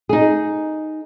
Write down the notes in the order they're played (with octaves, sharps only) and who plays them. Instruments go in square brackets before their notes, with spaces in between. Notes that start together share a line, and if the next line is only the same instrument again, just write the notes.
[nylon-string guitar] D#4 G#4